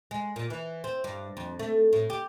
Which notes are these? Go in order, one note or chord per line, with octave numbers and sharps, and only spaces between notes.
G#3
A#2
E3
C4
G2
F2
A3
A2
G4